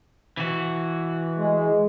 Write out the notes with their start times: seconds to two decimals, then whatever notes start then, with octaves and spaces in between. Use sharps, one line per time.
0.37 E3 F#4
1.38 G#3